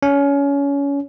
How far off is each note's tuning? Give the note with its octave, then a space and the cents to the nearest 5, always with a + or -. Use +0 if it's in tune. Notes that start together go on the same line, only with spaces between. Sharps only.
C#4 +25